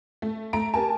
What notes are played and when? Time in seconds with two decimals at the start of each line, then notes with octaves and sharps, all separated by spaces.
0.22 A3
0.53 A3 A#5 D7
0.74 G4 A#4 G#5 A5